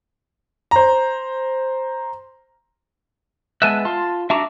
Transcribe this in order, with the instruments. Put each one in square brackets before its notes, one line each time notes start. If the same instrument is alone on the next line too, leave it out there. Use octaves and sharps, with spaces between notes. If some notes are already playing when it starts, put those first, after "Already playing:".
[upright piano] C5 A#5
[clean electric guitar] G#3 B3 E5 [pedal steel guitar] G#5 A5 F#6
[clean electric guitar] F4 [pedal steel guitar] A5 C6
[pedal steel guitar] D4 F#4 D6 [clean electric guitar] E5 A5 A#5